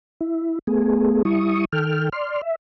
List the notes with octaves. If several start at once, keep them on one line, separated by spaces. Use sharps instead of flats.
E4
A3 B3 G#4
G3 E4 C#6 D#6
D#3 A4 G5 F6
D5 C6 F6
E5